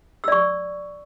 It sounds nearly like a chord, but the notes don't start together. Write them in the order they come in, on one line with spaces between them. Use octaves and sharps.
E6 D5 C#6